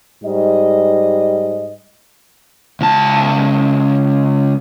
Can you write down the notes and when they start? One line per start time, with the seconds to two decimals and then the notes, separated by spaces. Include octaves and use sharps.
0.24 G#2 G3 D#5
2.81 C#2 A5